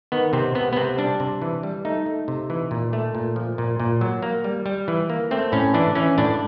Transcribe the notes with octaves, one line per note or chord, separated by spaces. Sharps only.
D#3 B3
C3 C4
C3 B3
B3
C3 C4
G3 D4
C3
E3
G3
A3 D#4
A3
C3
E3
A#2
A3
A#2
F3
A#2
A#2
F#3
A#3
G3
G3
E3
A#3
A3 C4
A2 C#4
E3 D4
E3 C#4
A2 D4